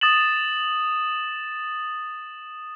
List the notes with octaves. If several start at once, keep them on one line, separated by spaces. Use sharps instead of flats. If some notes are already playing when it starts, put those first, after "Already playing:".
D#6 A6 E7 F#7